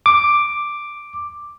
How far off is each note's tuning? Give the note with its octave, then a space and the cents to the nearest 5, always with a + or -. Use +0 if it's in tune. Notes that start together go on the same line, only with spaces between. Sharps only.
D6 +5